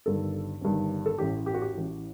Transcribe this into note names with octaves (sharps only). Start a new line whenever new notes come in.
G1 G2 D#3 A4
G1 G2 D#3
A4
A1 A2 G4
G4
F#4
G4
A1 A2